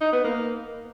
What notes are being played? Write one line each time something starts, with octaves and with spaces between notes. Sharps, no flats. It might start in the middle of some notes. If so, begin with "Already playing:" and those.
D#4
B3
A#3